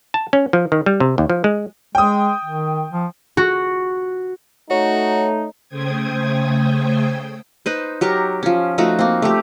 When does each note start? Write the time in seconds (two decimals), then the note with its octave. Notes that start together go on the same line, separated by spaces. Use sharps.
0.14 A5
0.33 C#4
0.53 F3
0.72 D#3
0.86 G3
1.00 C3
1.18 D#2
1.30 F3
1.44 G#3
1.95 G#3 G5 D#6
2.44 D#3
2.92 F3
3.37 F#4
4.71 A3 D#4 F#4 C#5
5.69 C#3 A3 C5 G5 D#6 G#6
7.66 D#4 B4 C5
8.01 F#3 G4 A#4 C#6
8.43 F3 C#4
8.78 F3 A3 D#4 F#4
8.99 A#3 C4
9.22 A3 G4